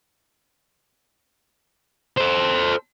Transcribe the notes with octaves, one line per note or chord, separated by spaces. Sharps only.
A4 C5